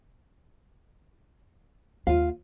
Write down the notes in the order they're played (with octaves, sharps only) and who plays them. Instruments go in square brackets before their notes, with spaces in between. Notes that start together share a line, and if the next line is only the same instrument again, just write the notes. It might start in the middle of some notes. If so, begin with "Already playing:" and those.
[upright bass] D#2 [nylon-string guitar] F4 F5